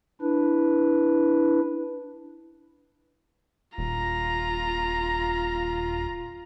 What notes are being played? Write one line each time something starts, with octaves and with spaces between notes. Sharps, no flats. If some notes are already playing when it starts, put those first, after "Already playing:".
D4 E4 B4
D#1 F4 A#5